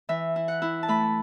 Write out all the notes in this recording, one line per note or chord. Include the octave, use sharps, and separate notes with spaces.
E3 E5
E4
F#5
E4
A5
A3 B5